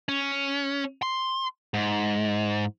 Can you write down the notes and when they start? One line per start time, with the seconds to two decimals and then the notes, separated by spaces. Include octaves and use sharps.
0.09 C#4
1.02 C6
1.74 G#2